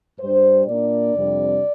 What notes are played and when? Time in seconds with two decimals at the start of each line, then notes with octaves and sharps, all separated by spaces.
0.20 G2 G3 D4 C5
0.66 A#2 A#3 D4 D5
1.14 F2 C3 G3 D4